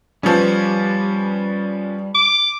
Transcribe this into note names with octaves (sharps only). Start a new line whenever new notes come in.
F3 G3 B3 C#4
D6